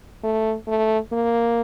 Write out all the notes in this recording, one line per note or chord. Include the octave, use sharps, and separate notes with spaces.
A3
A3
A#3